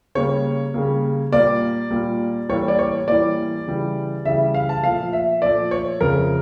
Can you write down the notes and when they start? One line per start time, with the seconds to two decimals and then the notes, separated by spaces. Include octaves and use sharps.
0.15 C#3 G3 A#3 C#5
0.74 C#3 G3 A#3
1.32 A#2 G3 A#3 D5
1.91 A#2 G3 A#3
2.49 A2 E3 G3 A#3 C#5
2.68 D5
2.79 C#5
3.08 A2 E3 G3 A#3 D5
3.67 C#3 E3 G3
4.25 C#3 E3 G3 E5
4.54 F5
4.69 A5
4.83 A#2 F3 A3 F5
5.13 E5
5.42 A#2 F3 A3 D5
5.71 C#5
6.01 F2 C#3 F3 A3 A#4